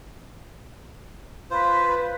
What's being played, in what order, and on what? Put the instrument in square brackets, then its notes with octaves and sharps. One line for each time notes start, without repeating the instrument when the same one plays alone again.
[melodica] F4 C5 [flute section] B4